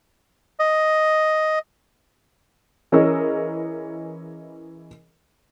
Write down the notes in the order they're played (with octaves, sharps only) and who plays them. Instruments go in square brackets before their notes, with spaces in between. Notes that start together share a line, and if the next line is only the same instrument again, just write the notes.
[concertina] D#5
[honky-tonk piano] E3 C#4 G#4 A#4 D#5 E6